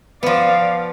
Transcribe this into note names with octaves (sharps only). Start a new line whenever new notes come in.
F3 B3 D5 F5